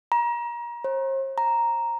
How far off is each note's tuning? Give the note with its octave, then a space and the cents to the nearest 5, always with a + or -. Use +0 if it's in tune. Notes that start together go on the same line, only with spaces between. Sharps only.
A#5 +30
C5 +45
A#5 +0